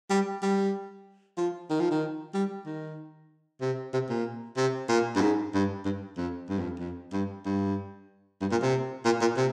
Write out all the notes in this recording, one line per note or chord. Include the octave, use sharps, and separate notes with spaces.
G3
G3
F3
D#3
F3
D#3
G3
D#3
C3
C3
A#2
C3
A#2
G2
G#2
G2
G2
F2
G2
F2
F2
G2
G2
G2
A#2
C3
A#2
A#2
C3